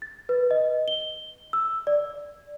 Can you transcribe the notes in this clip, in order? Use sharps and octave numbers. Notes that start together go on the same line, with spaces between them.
A6
B4
D#5
G7
E6
D5